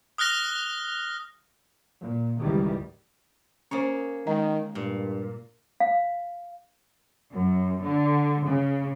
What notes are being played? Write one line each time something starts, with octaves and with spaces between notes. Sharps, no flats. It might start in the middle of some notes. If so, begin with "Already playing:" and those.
D#6 F6 F#6 A#6 G7
A#2
G#1 C#2 D#3 E3 G3
A#3 C#4 G#4 C5 C#5
D#3 G#3 D#5 A#5
G2 A#2
F5
F#2
D3
C#3